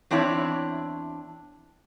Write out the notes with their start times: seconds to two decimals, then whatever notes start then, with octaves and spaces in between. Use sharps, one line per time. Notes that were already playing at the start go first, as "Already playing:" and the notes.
0.11 E2 C4 D4 E4 C#5